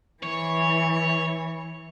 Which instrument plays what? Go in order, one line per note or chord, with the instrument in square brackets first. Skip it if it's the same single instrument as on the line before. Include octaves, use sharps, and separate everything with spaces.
[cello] E3 [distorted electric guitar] C#5